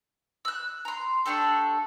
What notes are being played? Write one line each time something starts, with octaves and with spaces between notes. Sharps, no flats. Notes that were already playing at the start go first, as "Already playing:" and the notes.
E6 F#6
A#5 C6
A3 D4 G4 A4